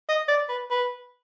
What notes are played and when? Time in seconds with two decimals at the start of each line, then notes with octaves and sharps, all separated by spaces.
0.09 D#5
0.28 D5
0.49 B4
0.70 B4